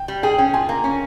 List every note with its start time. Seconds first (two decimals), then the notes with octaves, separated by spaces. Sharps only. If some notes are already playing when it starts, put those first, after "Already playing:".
Already playing: G5
0.08 G3
0.23 G#4 G5
0.38 C#4 G5
0.54 F4 G#5
0.69 A#3
0.84 C#4